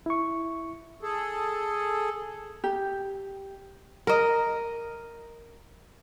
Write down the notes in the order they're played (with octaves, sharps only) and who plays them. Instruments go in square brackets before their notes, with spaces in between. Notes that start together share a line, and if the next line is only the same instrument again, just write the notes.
[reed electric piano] E4 C#6
[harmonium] G#4 A4
[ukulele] G4
[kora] A#4 D#5